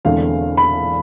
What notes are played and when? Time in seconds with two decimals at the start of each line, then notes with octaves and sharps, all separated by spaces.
0.05 E1 E2 D3 A3 C4 F5
0.57 B5